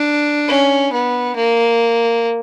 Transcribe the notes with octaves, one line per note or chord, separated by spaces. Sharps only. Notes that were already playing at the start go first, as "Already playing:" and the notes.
Already playing: D4
C#4
B3
A#3